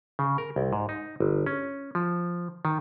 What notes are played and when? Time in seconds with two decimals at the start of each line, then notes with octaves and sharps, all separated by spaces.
0.19 C#3
0.38 A#4
0.56 C2
0.73 G#2
0.89 D#4
1.20 G1
1.46 C#4
1.95 F3
2.65 D#3